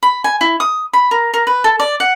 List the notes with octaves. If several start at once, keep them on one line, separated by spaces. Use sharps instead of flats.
B5
G#5
E4
D#6
B5
A#4
A#4
B4
A4
D5
F#5